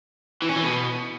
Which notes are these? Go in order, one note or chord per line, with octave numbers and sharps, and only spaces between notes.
E3
C#4
E3
B2